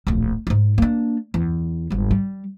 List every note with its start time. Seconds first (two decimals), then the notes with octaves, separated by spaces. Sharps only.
0.07 D1 A#1
0.47 G#2 D#4
0.78 A#3 D4
1.34 E2
1.90 G1 G#2
2.11 G3